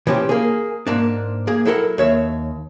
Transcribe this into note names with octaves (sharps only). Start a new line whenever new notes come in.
E3 F3 C#4 G4
A#3 G#4
G#2 A#3 D4
A#3 G#4
F#3 E4 A4 A#4 F#5
D#2 C#5 E5